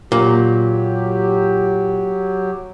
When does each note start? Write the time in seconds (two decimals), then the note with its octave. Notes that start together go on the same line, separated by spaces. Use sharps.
0.12 A#2 F#3 G4